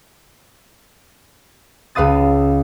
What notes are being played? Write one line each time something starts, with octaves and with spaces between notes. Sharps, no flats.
C#2 B4 F5 D#6 A6